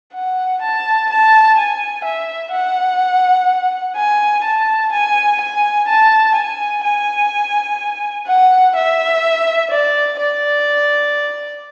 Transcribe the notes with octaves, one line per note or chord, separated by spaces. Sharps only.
F#5
A5
A5
G#5
E5
F#5
G#5
A5
G#5
G#5
A5
G#5
G#5
F#5
E5
D5
D5